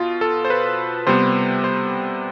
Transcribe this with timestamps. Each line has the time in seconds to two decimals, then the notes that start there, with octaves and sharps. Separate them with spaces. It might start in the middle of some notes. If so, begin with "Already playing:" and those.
Already playing: B2 F4
0.21 A4
0.45 C5
0.50 B4
1.07 C3 G3 B3 C5
1.64 C5